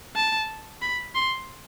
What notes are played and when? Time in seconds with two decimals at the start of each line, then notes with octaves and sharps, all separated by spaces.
0.16 A5
0.82 B5
1.15 C6